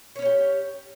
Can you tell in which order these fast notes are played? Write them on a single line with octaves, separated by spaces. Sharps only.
C#5 C#4 E4 G4